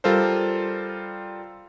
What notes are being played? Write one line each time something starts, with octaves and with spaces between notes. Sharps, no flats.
G3 F4 A4 A#4 C5